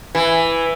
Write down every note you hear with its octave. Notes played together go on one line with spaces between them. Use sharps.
E3